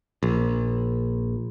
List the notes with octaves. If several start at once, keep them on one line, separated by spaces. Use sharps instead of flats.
A#1